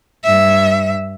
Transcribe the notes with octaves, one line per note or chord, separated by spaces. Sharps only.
G2 E5